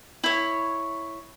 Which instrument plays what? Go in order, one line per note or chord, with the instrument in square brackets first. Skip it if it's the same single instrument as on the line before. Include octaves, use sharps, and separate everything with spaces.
[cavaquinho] E4 C#5